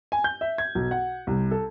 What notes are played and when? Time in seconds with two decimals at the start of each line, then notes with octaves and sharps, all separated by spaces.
0.12 G#5
0.24 G6
0.41 E5
0.58 G#6
0.75 B1
0.91 F#5
1.27 C2
1.51 A4